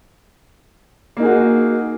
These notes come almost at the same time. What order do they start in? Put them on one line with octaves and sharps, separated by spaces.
A#3 D#4 G#4 F#4